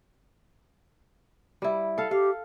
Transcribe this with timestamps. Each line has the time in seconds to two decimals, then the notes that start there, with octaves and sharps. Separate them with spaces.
1.62 G3 E4
1.98 A4 F5
2.11 G4 F5